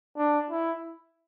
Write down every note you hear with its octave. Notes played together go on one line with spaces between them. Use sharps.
D4
E4